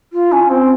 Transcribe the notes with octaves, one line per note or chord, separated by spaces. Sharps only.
F4
C#4
C4